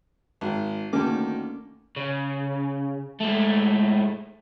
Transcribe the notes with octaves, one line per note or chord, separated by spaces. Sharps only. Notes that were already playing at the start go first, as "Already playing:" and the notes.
G#1
D2 D#3 A#3 C#4 D6
C#3
G#2 A3